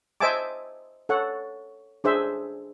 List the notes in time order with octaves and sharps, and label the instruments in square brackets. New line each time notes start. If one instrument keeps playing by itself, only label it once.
[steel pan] C5 D#5 E5 G#5 A5 D6
A4 C#5 F#5
D4 G#4 C5 E5